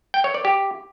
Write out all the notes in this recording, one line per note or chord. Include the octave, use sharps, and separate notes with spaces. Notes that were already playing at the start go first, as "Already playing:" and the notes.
G5
C#5
D5
G4